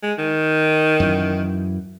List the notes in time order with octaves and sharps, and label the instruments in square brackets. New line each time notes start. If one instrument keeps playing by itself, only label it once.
[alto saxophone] G#3
D#3
[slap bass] F#2 E3